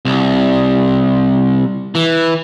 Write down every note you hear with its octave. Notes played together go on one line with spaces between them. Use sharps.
C2
E3